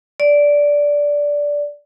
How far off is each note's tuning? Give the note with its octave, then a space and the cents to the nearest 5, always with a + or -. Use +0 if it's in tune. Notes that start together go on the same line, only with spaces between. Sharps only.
D5 -10